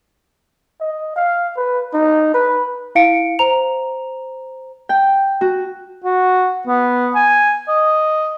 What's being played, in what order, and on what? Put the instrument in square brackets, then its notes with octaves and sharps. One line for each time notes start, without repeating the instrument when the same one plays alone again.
[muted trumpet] D#5
F5
B4
D#4
B4
[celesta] E4 F5 C#7 D7
C5 A#5 F7
[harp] G5
F#4
[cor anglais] F#4
B3
G#5
D#5